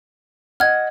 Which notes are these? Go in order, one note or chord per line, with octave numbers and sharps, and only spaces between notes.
D#5 F#5 F6 G#6